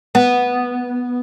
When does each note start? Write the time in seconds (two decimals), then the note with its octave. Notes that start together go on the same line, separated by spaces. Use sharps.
0.15 B3